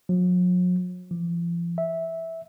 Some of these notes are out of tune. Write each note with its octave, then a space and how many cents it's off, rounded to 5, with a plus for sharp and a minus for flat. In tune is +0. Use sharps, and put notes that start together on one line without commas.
F#3 -45
F3 -40
E5 -10